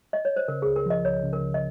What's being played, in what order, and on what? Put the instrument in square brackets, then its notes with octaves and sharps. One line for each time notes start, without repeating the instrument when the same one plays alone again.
[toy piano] D#5
C#5
C5
[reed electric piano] C#3 [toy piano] A#4
[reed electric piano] C#2 [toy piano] G#4
[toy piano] A#4
[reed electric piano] F3 [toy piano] D#5
[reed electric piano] C#2 [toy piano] C#5
[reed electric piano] C#3
[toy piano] A#4
[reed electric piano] C#2
[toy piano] D#5